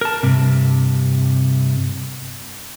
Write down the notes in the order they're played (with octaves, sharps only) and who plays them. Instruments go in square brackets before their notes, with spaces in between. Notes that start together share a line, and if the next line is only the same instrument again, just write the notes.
[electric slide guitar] A#4 A5
G2 C3